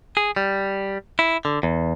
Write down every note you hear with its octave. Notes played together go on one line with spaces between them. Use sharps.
G#4
G3
E4
D3
E2